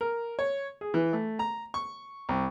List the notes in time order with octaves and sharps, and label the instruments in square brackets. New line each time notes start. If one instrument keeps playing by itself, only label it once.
[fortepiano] A#4
C#5
G#4
E3
A3
A#5
C#6
C2